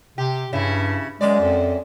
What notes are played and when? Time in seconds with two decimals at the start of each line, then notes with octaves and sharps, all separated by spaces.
0.18 C3 G4
0.53 G2 C#3 E4
1.21 F#2 G#3 D5
1.41 F2